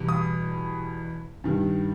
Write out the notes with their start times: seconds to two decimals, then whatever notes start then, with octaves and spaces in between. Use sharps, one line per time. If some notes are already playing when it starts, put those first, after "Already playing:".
Already playing: E2 B2 G3
0.09 D#6
1.44 G2 D#3 G3